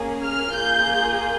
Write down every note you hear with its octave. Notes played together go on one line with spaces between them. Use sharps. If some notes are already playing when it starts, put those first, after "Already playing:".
Already playing: A#3 C#4 G#4
F6
A#3 F4 G#4 G6